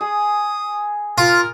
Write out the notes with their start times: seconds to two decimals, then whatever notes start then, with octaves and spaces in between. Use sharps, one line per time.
0.01 G#4 D#6
1.18 F4 A#4